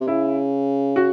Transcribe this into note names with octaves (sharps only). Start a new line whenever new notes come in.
C3
C#3 E4
F#4